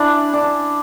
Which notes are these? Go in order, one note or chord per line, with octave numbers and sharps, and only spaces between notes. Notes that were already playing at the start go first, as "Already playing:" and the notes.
Already playing: D4 E4
D4